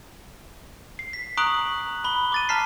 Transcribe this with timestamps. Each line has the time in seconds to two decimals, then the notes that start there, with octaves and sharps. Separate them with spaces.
0.99 C7
1.13 B6
1.37 A#5 C#6 D#6 F#6 D7 F#7
2.04 B5 G7
2.32 D6 A6 D#7
2.49 A5 A#5 F6 B6 C7